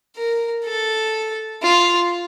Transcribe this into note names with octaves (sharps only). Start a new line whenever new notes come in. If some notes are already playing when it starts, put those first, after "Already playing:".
A#4
A4
F4